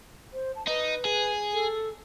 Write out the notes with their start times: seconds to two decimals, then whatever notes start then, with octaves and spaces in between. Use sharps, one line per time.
0.33 C5
0.56 A5
0.68 D#4 B4
1.05 G#4
1.53 A4